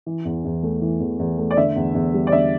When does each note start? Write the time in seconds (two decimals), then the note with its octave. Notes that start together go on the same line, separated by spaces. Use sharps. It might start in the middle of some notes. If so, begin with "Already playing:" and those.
0.06 E3
0.25 E2
0.45 E2
0.63 A3
0.82 E3
1.00 E2
1.19 E2
1.38 A3
1.51 D5
1.57 D3 E5
1.76 E2
1.95 E2
2.14 G3
2.27 D5
2.32 D3 E5